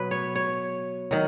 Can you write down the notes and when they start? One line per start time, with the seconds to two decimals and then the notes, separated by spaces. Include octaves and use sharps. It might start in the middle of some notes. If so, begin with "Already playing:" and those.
Already playing: B2 F#3 B4
0.11 C#5
0.35 C#5
1.11 D#3 F#3